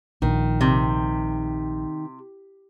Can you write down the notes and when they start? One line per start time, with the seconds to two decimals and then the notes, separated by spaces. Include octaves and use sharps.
0.22 A#1 D#3
0.61 C3